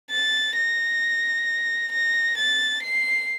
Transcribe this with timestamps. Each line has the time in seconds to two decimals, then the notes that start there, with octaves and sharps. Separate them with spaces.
0.10 A6
0.56 A#6
1.92 A#6
2.38 A6
2.83 C7